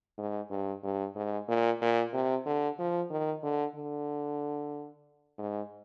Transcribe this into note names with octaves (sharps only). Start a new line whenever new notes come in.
G#2
G2
G2
G#2
A#2
A#2
C3
D3
F3
D#3
D3
D3
G#2